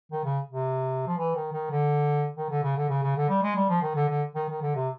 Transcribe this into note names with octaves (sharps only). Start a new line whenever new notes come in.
D#3
C#3
C3
F3
E3
D#3
D#3
D3
D#3
D3
C#3
D3
C#3
C#3
D3
G3
G#3
G3
F3
D#3
D3
D3
D#3
D#3
D3
C3